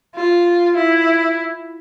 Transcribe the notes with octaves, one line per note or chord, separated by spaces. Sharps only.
F4
E4